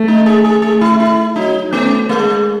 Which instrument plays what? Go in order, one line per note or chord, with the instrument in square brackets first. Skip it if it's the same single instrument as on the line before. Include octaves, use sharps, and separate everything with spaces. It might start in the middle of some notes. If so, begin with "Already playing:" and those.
Already playing: [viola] A3
[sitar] D#4
G#4
G#4
[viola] A3 [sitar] G#4
[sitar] E4
E4
[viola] F#3 [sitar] D#4
[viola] A3 [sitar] B3
[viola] G#3 [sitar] A3